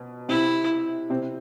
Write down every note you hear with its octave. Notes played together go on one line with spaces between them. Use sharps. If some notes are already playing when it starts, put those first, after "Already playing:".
Already playing: B2
C3 C4 E4
C3 C4